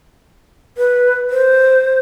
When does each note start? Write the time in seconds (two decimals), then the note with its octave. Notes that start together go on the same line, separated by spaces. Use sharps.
0.78 B4
1.30 C5